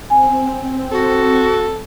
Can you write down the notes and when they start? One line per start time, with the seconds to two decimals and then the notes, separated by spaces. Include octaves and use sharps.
0.10 C4 G#5
0.91 F#4 A4